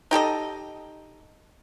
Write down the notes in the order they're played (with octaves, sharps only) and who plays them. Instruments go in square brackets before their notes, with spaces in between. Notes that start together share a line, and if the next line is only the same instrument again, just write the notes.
[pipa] D#4 G4 A4 D#5